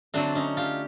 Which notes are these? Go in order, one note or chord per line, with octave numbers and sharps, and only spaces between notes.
D3 F#3 A3 C4 D4
C#4 D#4
F4 G4